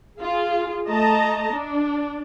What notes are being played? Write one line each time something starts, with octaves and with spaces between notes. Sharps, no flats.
F4 G#4
A3 D#5 A5 A#5
D4